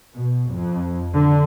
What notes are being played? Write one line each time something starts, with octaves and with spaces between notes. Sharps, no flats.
B2
F2
D3